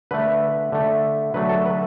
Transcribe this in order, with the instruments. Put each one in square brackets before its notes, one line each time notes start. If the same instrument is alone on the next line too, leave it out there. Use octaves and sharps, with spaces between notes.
[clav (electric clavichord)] D3 A3 B4
D3 A3
D3 F#3 A3 B4
A4
B4